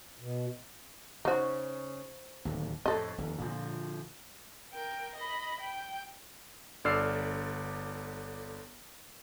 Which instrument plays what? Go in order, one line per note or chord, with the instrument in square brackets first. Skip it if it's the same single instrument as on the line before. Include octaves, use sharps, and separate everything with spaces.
[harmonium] B2
[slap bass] C#3 [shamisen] D#4 F#4 [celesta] C5 C#6
[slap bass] D1 D#2
[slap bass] F2 A2 [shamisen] A4 D#5
[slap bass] F1 D#2
A#2 D3 F3
[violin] A#4 G5
D#5 B5
G5
[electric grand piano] G1 D3 D5 E6 F6 C7